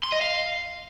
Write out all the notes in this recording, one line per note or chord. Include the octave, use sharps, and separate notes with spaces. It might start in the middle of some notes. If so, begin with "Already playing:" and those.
C6
D#5
F5